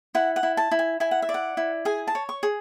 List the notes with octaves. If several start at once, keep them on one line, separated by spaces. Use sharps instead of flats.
E4 F#5
F#5
E4
A5
E4
G#5
E4 G#5
F#5
E5
D5
F#5
E4
G#4 G#5
A5
C#5
C#6
G#4